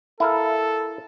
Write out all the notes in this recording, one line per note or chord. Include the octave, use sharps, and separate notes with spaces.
E4 A4 A#4 F5